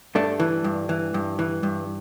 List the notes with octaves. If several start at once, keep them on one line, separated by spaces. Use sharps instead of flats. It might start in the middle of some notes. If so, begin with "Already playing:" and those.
G2 A3 D4
E3
G2
E3
G2
E3
G2